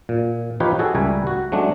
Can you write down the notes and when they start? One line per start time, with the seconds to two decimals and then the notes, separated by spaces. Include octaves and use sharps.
0.09 A#2
0.60 F3 D#4 F4 G4 B4 C#5
0.79 F#4 G#4 A4
0.95 C#2 G3 A#4 E5 G#5
1.27 F#4
1.52 F#3 G#3 A3 C#4 D4